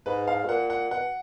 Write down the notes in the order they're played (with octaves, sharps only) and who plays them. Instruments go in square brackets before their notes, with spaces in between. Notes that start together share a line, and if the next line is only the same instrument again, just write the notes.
[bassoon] G#2 [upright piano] B4
[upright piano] F5
[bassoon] B2
[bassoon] A#2 [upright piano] F#5
[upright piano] F#5
[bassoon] B2 [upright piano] F#5